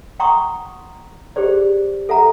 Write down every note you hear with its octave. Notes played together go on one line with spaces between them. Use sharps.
F#5 G5 A#5 C6 C#6 D#6
G4 G#4 C5 D5
A4 E5 F#5 A#5